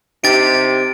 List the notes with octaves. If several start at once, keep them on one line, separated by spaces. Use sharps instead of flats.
C3 D#4 G4 A6 D7